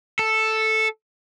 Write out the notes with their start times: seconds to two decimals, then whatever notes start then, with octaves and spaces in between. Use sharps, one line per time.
0.19 A4